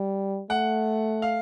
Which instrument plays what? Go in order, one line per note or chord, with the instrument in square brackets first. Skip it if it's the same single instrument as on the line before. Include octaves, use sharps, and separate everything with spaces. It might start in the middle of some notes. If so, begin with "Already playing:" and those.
Already playing: [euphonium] G3
[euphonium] A3 [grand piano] F#5
[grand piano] F5